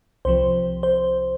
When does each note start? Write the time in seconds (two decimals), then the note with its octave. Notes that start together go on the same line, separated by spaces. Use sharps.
0.25 C2 C3 F3 C5
0.83 C5